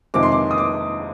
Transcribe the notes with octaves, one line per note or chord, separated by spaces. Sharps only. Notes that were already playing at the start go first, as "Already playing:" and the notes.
F2 C3 D#3 G#3 D6
C6
D6
D#6
D6